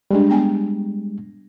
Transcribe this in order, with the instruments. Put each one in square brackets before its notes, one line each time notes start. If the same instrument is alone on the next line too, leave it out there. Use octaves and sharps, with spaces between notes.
[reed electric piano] G3 G#3 [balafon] D4 G4
[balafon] B3 G5 G#5